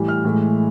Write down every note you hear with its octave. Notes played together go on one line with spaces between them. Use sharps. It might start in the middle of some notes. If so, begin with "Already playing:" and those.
Already playing: A2 E3 G3
F6
A2 E3 G#3